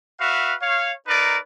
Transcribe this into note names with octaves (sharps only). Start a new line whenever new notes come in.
F#4 B4 E5 F5
C#5 F5
D#4 A#4 B4 D5